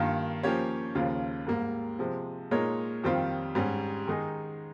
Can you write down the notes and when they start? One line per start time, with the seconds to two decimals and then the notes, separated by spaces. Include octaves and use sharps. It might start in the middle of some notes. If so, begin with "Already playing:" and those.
Already playing: G2 D#3 A#3 F4
0.43 F3 A#3 C#4 G4 C#5
0.95 D#2 C#3 F3 A#3 F4
1.47 G#2 G3 A#3
1.99 C3 F3 G#3
2.51 A#2 G#3 D#4 A#4 C#5
3.04 F2 D#3 G3 C4 F4
3.55 G#2 G3 C#4
4.07 D#3 G#3 D#4 G#4